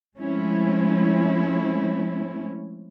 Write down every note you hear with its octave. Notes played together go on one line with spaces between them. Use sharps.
F3 G#3 A3 C4 C#4 E4